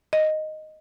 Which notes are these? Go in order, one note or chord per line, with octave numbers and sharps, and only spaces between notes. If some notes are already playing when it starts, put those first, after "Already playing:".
D#5